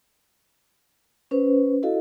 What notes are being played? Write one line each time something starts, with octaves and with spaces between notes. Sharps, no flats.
C#4 B4 C5
E4 F#4 A4 D#5 F5